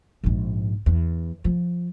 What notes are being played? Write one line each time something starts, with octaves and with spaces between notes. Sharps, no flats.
A#1 G#2
E2
F3 F4